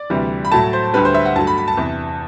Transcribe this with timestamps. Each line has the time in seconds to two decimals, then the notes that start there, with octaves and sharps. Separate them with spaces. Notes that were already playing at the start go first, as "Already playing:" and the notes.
Already playing: D5
0.10 D2 C3 E3 G3
0.45 B5
0.52 A2 F#3 A3 A5
0.73 C5
0.93 D2 D3 G3 B4
1.05 C5
1.14 E5
1.26 F#5
1.36 G2 F#3 A3 A5
1.47 B5
1.58 B5
1.68 A5
1.77 E2 C3 E3